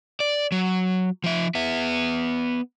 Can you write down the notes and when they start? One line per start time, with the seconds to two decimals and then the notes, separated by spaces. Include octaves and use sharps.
0.20 D5
0.52 F#3
1.24 F3 E5
1.55 B3 E5